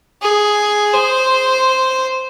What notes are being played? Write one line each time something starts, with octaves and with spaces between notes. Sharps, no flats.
G#4
C5